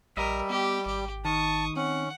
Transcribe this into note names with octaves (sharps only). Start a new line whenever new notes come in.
A#1 G3 A#4 D#5 E5
B3 G4
G#1 G4
D#3 A5 C#6 D#6
C4 C#4 F#5